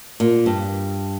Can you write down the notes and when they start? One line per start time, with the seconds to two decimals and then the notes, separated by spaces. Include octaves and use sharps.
0.20 A#2
0.46 G2